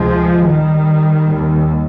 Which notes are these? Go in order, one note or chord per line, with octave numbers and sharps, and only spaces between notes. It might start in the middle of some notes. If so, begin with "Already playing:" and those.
Already playing: D2 C3 F3 G#3
D#3 G3
D#2